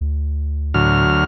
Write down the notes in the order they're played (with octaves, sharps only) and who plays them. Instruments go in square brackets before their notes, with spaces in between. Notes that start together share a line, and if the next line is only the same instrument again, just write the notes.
[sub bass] D2
[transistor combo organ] D2 F#3 F6 [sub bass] A2